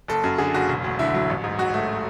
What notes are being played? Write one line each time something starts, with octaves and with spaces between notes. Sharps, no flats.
F#1 A4
F#2
D3 G#4
F#1 F#4
E1
D2
D3 E4
F#3
A1
G#2
F#3 F#4
A3